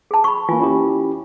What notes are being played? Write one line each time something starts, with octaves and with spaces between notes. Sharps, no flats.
G#4 A5
B5 C#6
E3 A#3 F4 G#5
C#4 E4 G4